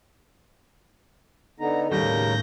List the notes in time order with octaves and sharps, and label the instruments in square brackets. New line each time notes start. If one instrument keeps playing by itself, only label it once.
[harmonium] D3 B3 D#4 [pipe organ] A#5
[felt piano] D#2 G3 [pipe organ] A2 G6 A#6 [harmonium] C#3 A#4